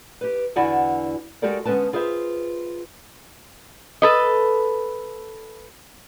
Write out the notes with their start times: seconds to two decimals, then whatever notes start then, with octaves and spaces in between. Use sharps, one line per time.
0.21 G4 B4
0.56 E2 D3 E4 F#4 D5 G#5
1.42 G#3 F#4 G4 A4 A#4 D5
1.65 D3 G#3 B3 C#4 B4 A5
1.93 F4 G#4 B4 C5 E5
4.02 A4 B4 D#5